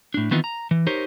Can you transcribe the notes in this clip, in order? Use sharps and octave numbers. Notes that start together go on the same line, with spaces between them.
A2 D4
D#3 E3 B3 C4 D#4 F4
A#5
E3
D#4 G4 A#4 C5 C#5